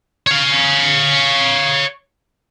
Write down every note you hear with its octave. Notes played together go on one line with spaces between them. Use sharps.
C#5 F5